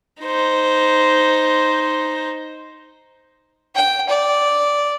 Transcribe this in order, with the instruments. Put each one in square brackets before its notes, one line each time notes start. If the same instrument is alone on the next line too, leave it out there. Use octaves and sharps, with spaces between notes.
[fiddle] D#4 C5
G5
D5